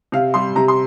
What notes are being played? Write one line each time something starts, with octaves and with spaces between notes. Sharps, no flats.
C3 F5
G3 C6
C3 A#5
C6